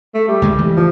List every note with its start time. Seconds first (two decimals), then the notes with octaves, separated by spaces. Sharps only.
0.14 A3
0.28 G3
0.42 C#2 G#3 A3
0.58 E3
0.76 F3